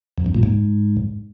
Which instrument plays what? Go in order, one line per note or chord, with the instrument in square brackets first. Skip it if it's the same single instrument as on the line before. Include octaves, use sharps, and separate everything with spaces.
[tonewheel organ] F2
G2
A#2
G#2